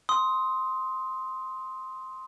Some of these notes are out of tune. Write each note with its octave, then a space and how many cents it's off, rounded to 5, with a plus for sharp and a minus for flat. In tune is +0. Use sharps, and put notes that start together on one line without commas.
C6 +0 D#6 +20